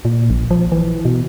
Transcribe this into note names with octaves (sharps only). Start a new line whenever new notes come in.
A#2
A#1
F3
E3
B2